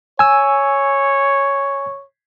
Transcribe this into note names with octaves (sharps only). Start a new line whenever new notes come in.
C#5 G#5 E6